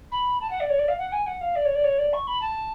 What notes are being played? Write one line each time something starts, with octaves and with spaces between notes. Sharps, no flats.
B5
A5
F#5
D5
C#5
D5
F5
F#5
G#5
F#5
F5
D5
C#5
D5
C#5
D5
C#6
B5
A5